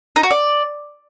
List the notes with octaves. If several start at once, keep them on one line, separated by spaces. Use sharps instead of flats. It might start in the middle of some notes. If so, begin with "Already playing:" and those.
D#4
F#4
D5